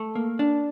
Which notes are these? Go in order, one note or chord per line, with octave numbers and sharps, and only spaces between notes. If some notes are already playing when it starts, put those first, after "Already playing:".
Already playing: A3
A#3
D4